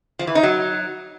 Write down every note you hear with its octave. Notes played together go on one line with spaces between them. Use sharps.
F3
E3
D#4
F#3